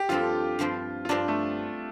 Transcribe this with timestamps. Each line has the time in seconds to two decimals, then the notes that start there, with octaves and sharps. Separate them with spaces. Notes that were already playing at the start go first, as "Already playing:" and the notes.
Already playing: G4
0.09 G2 F3 C4 F4 A4
0.59 G2 F3 C4 G4 C5
1.05 F4
1.09 G2 F3 C4 D4 G4 C5
1.28 A3